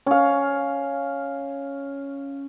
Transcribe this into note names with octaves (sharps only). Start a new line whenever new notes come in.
C#4 F5